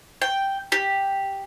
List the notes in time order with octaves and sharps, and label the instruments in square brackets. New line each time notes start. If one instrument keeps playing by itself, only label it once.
[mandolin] G5
G4